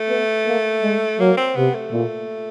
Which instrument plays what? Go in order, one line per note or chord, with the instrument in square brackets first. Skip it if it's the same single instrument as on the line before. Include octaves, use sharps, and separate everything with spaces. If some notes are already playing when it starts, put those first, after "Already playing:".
Already playing: [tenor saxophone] A3
[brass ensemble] B3
A#3
G#3
[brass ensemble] F#3 [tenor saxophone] A#3
[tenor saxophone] C4
[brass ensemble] C3 [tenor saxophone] B3
[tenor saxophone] A3
[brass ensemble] A#2